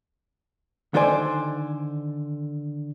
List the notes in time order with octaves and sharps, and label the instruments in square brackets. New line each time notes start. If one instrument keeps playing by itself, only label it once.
[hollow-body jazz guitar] D3 D#3 A4 C5 D5 G#5